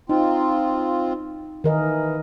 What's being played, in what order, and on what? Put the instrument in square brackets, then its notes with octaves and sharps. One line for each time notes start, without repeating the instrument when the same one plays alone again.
[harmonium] C4 F4 [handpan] D#4
[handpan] D#3 A#4 D#5 [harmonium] E3